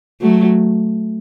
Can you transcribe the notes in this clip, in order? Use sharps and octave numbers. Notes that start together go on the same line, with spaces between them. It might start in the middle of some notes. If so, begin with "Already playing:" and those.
F#3 A3